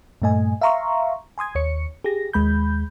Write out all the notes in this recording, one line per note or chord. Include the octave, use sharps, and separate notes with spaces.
G2 A#2 A3 D#5 G#5
E5 F5 A#5 C6 C#6
G#5 C6 D#6 G#6
D#2 C#5 C#7
G4 G#4 A#6
D#2 G#3 B5 G6